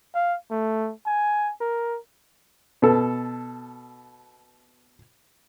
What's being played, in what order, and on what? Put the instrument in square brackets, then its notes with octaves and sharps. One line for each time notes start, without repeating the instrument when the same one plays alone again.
[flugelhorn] F5
A3
G#5
A#4
[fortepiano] B2 A4